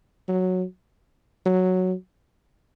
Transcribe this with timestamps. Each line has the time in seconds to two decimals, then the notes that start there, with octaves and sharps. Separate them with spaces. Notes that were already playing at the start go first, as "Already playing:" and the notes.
0.28 F#3
1.46 F#3